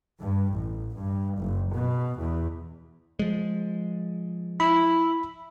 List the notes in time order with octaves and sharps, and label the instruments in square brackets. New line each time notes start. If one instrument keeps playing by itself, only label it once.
[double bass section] G2
A1
G2
F#1
B2
E2
[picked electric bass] F3 G#3
[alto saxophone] E4 [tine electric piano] B5